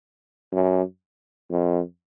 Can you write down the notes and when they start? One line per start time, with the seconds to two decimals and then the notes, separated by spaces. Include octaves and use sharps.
0.52 F#2
1.50 F2